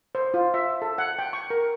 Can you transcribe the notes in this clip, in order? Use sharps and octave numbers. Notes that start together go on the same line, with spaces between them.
C5
F4
E5
A4
F#5
G5
C#6
A#4